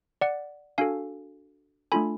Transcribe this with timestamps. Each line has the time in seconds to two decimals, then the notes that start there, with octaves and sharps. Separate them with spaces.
0.21 D5 F#5
0.78 D4 F#4 A4 F5 G#5
1.92 A3 D4 F4 A4 G#5 B5